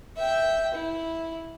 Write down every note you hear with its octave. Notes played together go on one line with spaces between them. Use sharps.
E5 G5
E4